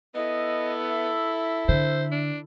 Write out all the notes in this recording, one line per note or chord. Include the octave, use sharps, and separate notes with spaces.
B3 E4 A4 D#5
E5
D3 C5
D4